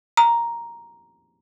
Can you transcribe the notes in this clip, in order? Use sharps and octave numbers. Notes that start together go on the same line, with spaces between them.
A#5